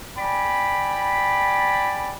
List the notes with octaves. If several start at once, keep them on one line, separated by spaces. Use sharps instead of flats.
D5 G5 G#5 B5